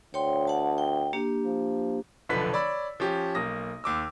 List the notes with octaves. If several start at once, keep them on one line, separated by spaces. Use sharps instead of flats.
D2 C#5 G5 C6
F#5 A5
G5
A#3 D4 G4
F3
F1 B1 D3 F3 B4 B6
C#5 D5 B5 E6
F3 C#4 G4
B1 A#3 D#6 A#6
D#2 D6 E6